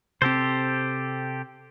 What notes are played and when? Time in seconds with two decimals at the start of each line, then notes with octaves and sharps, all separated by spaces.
0.22 C3 C4 G4 A4 C5